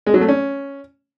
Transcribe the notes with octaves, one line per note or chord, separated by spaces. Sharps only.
G#3
F#3
A3
C#4